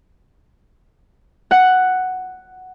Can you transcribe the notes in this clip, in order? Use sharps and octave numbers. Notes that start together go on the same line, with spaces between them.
F#5